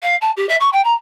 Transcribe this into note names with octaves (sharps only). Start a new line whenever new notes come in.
F5
A5
G4
E5
C#6
G5
A#5